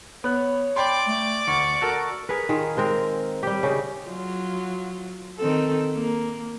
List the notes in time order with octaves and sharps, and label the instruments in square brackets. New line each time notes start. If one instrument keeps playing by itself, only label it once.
[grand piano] B3 F#6 [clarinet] C#5
[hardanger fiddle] D5 D6 [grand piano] G5 B5 C6
[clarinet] A3
[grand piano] D2 [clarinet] C#6
[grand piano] F#4 A4 A#4
[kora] G#4 A#4 B4
D#3 F4 G#4
G#3 C4 A#4
G3 G4
C#3 D#4
[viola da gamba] F#3 F4
D#3 C4 A4
A#3